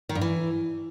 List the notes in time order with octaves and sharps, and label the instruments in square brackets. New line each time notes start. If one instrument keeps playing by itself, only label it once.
[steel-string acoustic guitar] D#3
G2
E3